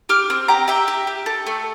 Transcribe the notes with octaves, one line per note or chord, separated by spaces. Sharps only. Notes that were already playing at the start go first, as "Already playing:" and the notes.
G4 D6 F6
C4
G4 G5 A#5
G4 E5 G5
G4
G4
A4
A3